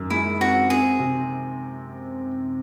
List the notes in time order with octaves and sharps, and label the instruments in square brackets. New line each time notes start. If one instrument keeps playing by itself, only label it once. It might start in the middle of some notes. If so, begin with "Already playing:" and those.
Already playing: [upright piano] F#2 D#3
[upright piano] G#3 [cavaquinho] E4
[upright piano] C4 [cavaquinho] F#4
[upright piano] C4 [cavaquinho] G#4
[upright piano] C3